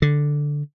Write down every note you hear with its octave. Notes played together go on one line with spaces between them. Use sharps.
D3